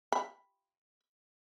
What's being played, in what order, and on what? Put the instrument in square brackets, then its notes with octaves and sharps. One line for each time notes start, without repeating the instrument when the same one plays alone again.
[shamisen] B5